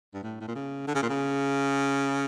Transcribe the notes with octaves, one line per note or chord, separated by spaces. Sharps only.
G2
A2
A2
A#2
C#3
D3
C#3
A#2
C#3